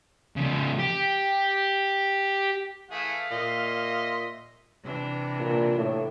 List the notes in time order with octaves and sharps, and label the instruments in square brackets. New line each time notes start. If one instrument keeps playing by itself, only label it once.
[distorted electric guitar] C#3 F3
G4
[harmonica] E3 A3 G#4 [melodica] E5 [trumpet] F5
[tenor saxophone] A#2 [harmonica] D#5 C6
[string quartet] C3 E3 D4
[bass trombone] A#2
A2